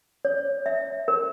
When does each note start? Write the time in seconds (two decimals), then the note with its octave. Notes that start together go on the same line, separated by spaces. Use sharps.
0.25 C#5
0.66 E5
1.08 A#4